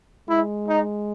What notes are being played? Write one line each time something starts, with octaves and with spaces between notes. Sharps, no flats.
G#3 E4
D#4